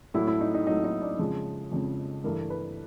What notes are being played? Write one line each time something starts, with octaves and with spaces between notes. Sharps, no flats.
A2 F#3 A3 E4
E4
D#4
D#4
A2 F#3 A3 D#4
D#4
D4
F2 C#3 F3 G#3
F2 C#3 F3 G#3
G2 E3 A3 A#4
B4